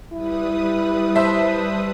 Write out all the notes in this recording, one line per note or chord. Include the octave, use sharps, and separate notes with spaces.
G3 E4 B4 D#6
C5 E5 A5